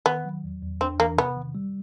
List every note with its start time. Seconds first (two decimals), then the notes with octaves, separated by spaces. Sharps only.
0.06 D#3 B3
0.25 F#3
0.44 E2
0.62 E2
0.81 C4 D4
1.00 E3 A#3
1.17 C3 B3
1.36 D#3
1.55 G3